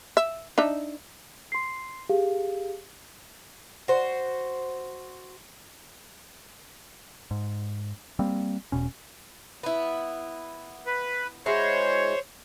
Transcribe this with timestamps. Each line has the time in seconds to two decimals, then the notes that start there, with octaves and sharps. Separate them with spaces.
0.17 E5
0.58 D4 D#4 E5
1.52 C6 C7
2.09 G4 G#4 F5
3.88 F#4 C5
7.31 G#2
8.19 G3 A#3 C4
8.72 E1 B2 C#4
9.63 B3 E4
10.87 B4
11.46 G#3 E4 F#4 C5 C#5